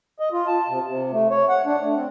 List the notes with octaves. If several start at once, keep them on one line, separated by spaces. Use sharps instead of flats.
D#5
F4
A5
C3
C3
A3
C#5
F#5
D4
A3
C4